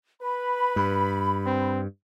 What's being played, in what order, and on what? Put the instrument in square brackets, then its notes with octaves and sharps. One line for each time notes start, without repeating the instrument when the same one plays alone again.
[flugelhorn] B4 [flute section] B5
[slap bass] G2
[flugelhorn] C4